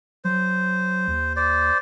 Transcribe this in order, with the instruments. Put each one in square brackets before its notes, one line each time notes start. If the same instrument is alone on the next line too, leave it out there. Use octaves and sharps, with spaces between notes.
[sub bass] F#3 [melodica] C5
[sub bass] D#2
[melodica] C5 D5